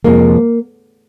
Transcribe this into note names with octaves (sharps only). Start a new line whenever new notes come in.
F2 C3 F3 G#3 A#3